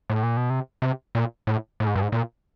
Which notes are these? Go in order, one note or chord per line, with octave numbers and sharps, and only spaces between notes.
A2
A#2
B2
C3
C3
A#2
A2
A2
G#2
G2
G#2
A#2